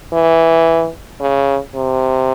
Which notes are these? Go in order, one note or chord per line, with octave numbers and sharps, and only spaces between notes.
E3
C#3
C3